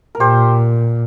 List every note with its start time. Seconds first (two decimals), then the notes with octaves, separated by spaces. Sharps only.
0.15 A#4
0.20 A#2 G4 C5